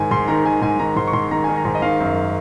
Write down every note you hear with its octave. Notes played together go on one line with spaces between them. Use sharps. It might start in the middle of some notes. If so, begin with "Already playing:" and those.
Already playing: G#2 D#3 G#5
G#2 C6
D#3 A#5
D#3 G#5
G#2 G#5
D#3 A#5
G#2 C6
C#6
G#2 C6
D#3 A#5
D#3 G#5
A#5
G#2
D#5
D#3 F5
F#2